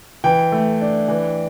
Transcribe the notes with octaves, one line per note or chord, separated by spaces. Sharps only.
E3 G5
A3
D4
E3